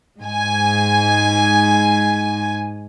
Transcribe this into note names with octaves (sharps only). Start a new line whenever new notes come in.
G#2 G#5